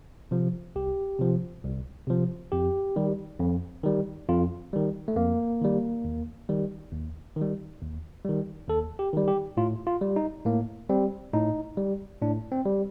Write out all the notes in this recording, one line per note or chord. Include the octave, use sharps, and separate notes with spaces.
C3 F3
C2 G4
C3 F3
C2
C3 F3
F2 G4
D#3 G3
F2
D#3 G3
F2 F4
D#3 G3
A3
F2 A#3
D#3 G3
D#2
D#3 G3
D#2
D#3 G3
D#2
D#3 G3
D#2 A4
G4
D#3 G3
G4
A2 F4
F4
G3
D#4
A2 A#3
G3 C4
A2 D#4
G3
A2 D4
C4
G3